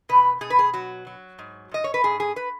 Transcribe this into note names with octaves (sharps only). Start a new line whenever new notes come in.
B2 B4
B2 G#4
B4
G#4
F#3 F#4
F#3
G#2
G#2 D#5
C#5
B4
G#2 G#4
G#4
B4